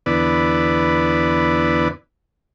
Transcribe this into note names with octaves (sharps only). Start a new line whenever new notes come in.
E2 D3 B3 E4 B4 D5